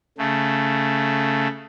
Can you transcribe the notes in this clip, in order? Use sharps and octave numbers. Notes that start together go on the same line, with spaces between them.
C#3 A3